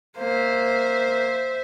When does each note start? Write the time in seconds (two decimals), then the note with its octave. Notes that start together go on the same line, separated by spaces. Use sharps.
0.18 A#3 C5 E5